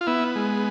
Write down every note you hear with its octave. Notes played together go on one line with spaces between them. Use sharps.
F4
B3 E4
G#3